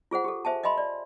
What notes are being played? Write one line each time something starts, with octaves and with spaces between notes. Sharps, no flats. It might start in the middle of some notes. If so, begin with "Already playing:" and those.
F4 G#4 C5 F#5
G4 A4
C5 E5 G#5 A5
D#5 E5 G#5 B5 C6
D5